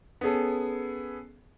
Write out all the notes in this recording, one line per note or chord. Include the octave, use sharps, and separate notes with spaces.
B3 C#4 G#4 A4